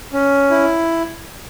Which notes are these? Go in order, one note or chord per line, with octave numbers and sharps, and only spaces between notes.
C#4
E4